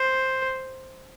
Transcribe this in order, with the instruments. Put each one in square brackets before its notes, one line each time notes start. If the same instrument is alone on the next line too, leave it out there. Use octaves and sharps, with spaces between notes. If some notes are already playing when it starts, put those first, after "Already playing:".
Already playing: [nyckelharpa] C5